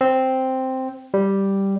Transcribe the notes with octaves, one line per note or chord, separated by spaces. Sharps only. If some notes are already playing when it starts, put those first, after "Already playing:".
C4
G3